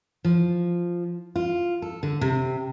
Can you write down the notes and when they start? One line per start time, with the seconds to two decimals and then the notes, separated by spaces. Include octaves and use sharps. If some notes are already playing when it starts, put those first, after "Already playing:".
0.25 F3
1.36 F4
1.82 A4
2.03 D3
2.21 C3